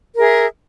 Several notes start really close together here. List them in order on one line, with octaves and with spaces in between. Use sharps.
A#4 G#4 E5